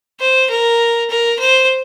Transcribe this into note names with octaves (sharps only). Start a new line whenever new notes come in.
C5
A#4
A#4
C5